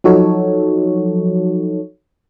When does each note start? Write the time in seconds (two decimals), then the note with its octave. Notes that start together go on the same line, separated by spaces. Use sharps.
0.04 F3 F#3 D#4 F#4 A4 C#5